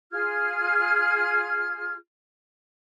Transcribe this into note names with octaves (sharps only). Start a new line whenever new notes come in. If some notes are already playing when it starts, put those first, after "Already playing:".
F4 G#4 F6 G#6